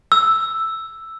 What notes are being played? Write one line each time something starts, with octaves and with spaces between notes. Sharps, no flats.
E6